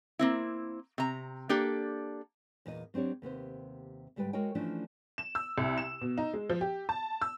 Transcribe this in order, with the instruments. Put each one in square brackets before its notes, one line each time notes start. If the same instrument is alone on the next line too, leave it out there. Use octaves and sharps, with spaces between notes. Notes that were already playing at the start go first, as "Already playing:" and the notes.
[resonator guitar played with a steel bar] A#3 C4 E4
C3 A#5
A#3 D4 G4 A4
[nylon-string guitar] E2 A#2 D#5
F#3 C4 D4 G4 C#5
D#2 C3 B3 C5
D2 G#2 G3 B4 G5
G#3 F#4 A#4 C#5 D#5 G5
E3 F3 A3 C#4 D4
[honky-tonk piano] E7
E6
C2
E7
B2
D#4
G#3
F3
G4
A5
E6